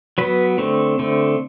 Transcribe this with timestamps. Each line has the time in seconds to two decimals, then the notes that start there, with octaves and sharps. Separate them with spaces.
0.18 F#3 B3 B4
0.58 D3 A3 C4
0.99 D3 A3 C4